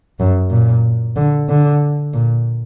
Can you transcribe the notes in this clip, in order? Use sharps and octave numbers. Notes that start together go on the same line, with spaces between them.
F#2
A#2
D3
D3
A#2